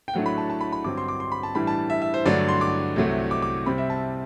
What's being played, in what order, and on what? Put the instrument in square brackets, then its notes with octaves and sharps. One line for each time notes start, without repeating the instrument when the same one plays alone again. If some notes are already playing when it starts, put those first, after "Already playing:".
[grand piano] G5
A2 F#3 A3 D4 F#5
B5
A5
A5
B5
B5
G2 D3 F#3 C4 D6
C6
D6
C6
B5
A5
A2 E3 G3 D4 B5
A5
E5
E5
C5
G2 D3 F#3 A3 D4 D5
C6
D6
C2 C3 F#3 A3
D6
D6
C3 G3 C4 B5
E5
A5